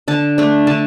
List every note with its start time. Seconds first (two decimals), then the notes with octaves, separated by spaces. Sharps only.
0.08 D3 A5
0.38 A3 D4
0.67 D3 A5